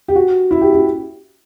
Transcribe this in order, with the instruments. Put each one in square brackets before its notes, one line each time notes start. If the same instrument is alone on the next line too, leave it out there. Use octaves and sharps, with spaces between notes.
[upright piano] G4
F#4
E4
G4
G4